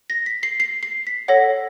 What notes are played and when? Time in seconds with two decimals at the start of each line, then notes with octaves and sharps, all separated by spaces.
0.10 A#6
0.26 B6
0.43 C7
0.60 C7
0.83 C7
1.07 B6
1.28 A4 C#5 F#5 A#6